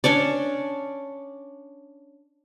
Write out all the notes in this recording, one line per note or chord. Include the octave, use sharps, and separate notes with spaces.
C#4 D4 C#5 D5